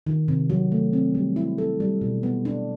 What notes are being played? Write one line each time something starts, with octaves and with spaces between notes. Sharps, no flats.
D#3
C3
F#3
A3
C4
G3
E4
A4
G3
B2
B3
D4